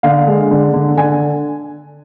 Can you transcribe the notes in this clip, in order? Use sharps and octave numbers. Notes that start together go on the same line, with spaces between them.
D3 F5
G#3
D3
D3
D3 G#5